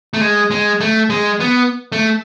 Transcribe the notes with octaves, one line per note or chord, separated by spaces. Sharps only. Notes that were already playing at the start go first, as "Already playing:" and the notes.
A3
G#3
G#3
A3
G#3
B3
A3